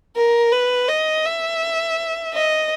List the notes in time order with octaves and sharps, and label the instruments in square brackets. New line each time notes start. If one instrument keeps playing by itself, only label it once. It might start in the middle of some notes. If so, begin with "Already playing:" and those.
[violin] A#4
B4
D#5
E5
D#5